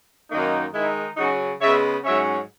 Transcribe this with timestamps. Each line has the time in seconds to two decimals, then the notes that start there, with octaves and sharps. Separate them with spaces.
0.30 F#2 D#3 A#3 D#4
0.73 D#3 G#3 D#4 E4
1.17 C#3 F#3 C#4 D#4 F#4
1.60 C#3 G#3 B3 C#5 E5
2.04 G#2 F#3 C#4 C#5 E5